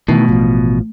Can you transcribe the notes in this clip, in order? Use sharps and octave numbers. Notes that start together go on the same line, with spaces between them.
B2 D#3 E3 A3
A1 F3